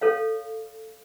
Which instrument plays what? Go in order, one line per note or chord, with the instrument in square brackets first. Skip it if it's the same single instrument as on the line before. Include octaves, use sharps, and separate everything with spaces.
[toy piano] A4 C#5 F5